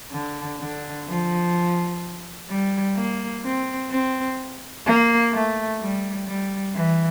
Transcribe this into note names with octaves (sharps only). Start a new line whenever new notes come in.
D3
D3
F3
G3
A#3
C4
C4
A#3
A3
G3
G3
E3